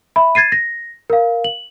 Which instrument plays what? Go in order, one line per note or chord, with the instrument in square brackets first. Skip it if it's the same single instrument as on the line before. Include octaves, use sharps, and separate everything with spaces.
[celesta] E5 B5
G#6 A6 C7 D#7
A#6
A#4 F5
F#7